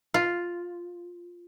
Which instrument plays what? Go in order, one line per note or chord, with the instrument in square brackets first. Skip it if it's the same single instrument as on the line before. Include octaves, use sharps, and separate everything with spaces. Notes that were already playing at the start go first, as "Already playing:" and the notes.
[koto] F4